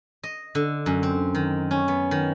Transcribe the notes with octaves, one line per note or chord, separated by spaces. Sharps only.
D#5
D3
F#2
C4
D#3
C#4
B3
D#3